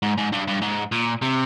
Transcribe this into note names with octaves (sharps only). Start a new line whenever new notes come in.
G#2
G#2
G2
G2
G#2
A#2
C3